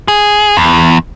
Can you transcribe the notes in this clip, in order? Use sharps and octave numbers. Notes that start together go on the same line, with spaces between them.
G#4
E2